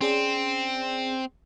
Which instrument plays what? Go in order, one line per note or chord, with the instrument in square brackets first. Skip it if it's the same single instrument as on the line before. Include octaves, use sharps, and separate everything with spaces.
[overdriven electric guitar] C4 [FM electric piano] C#4 G#4 D5